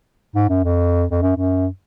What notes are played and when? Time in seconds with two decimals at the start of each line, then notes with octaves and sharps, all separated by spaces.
0.35 G#2
0.49 F#2
0.64 F2
1.11 F2
1.22 F#2
1.36 F#2